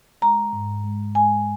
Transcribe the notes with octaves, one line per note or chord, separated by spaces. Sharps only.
G#3 A#5
G#2
G#3
G#3 G#5